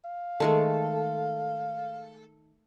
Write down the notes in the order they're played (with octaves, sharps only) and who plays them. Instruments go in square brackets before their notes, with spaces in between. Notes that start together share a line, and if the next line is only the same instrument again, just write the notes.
[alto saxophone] F5
[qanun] D#3 G#3 A3 [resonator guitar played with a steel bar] A4